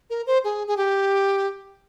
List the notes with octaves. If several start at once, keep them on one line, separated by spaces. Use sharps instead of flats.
A#4
C5
G#4
G#4
G4